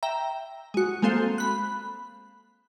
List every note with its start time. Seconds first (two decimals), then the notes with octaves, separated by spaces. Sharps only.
0.03 E5 G5 A#5
0.74 G#3 F#4
1.02 G#3 A#3 C4 A4 C5 F5
1.38 B5 F#6